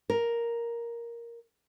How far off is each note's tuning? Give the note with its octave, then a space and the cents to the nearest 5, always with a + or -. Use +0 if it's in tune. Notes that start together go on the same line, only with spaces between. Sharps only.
A#4 +5